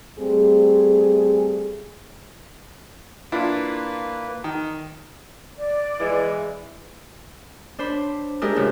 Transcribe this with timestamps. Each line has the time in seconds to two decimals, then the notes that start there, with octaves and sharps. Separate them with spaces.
0.20 G3 A3 C4 G#4
3.32 A#3 D4 E4 F4 B4
4.44 D#3
5.57 D5
6.00 E3 G#3
7.79 D4 C5 B5
8.42 G#3 D4 E4 G4 G#4 A#4
8.56 A2 C#3 F4